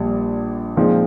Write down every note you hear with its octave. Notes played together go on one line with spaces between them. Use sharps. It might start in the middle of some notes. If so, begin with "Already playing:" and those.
Already playing: A#1 A#2 G3
A#2 F3 G#3 C4 D#4